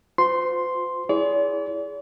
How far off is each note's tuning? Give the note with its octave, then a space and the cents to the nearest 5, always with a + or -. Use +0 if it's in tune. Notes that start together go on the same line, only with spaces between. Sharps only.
F4 +40 C5 -40 C6 +0
E4 +0 G#4 +0 D5 -45